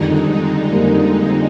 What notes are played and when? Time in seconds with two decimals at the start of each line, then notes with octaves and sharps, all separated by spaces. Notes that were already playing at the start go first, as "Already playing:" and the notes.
Already playing: F2 D3 D#3 G3 G#3 D#4
0.72 G3 A#3